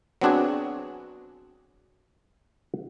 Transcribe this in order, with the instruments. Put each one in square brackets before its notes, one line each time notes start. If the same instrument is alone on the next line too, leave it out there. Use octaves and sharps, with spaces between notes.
[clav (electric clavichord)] F#3 B3 C4 D4 F#4 G#4